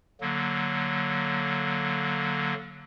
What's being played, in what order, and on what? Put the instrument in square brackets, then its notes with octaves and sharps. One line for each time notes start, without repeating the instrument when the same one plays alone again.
[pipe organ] D3 F#3 A#3